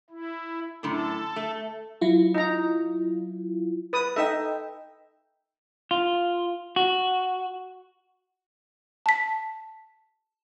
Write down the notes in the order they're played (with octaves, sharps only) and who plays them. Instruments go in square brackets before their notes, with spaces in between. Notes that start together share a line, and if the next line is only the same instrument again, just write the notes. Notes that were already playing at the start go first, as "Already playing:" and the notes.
[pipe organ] E4
[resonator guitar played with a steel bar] F#2 A2 D3 [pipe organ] A4
[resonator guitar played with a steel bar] A3
[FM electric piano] F#3 E4 F4
[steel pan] D#4 A#5
B4 D#6
[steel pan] D#4 E5 [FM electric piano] A4 D#5 G5
[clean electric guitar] F4
F#4
[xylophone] A5 B6